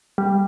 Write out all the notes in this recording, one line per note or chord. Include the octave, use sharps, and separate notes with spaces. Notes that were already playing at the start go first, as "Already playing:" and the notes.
G3